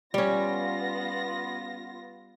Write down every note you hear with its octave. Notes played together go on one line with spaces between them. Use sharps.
G3 B3 C#4 F4 A#6